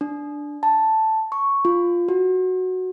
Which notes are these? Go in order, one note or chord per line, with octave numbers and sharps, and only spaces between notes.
D4
A5
C#6
F4
F#4